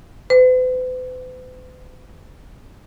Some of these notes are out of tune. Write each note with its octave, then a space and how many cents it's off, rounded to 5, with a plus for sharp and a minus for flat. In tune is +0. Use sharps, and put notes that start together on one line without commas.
B4 +45